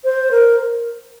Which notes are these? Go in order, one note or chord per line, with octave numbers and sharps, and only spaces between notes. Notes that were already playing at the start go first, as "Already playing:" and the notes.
C5
A#4